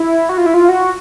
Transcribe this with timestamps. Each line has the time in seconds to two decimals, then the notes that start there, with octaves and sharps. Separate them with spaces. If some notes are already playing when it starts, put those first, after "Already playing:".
Already playing: E4
0.29 F#4
0.38 F4
0.46 E4
0.54 F4
0.69 F#4